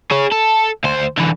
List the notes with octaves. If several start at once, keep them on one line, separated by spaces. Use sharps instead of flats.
G#4 C#5
A4
D2 C5
D3 E3